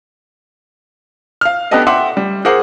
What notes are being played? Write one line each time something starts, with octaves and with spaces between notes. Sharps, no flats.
F5 F6
B3 D4 G4 A4 D5 D#5
E5 F#5 G5 C6 D6
G3
G#4 A#4 C5 F#5 D6